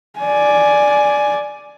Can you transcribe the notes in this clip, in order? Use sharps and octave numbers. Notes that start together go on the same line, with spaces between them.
D5 G#5